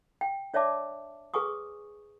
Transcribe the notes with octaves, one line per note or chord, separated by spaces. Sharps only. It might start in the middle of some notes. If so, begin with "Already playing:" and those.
G5
D4 C#5 D5 E5 A5 D6
G#4 B4 G#5 C#6 D#6